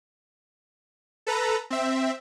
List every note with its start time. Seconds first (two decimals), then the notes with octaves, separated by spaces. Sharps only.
1.27 A4 B4 A#5
1.70 C4 E5